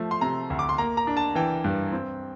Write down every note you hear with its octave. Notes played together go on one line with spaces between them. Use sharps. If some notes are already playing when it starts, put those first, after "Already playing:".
Already playing: F3 A3
C6
C3 A#5
D2
D6
C6
A#3 A#5
A#5
D4
A5
E3 G5
G2
C4